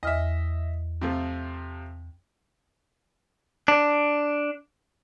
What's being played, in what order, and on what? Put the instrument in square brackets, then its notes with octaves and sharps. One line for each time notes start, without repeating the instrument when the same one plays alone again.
[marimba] E2 F6 [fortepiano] D#5 E5
[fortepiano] C3 F3 A3
[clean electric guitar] D4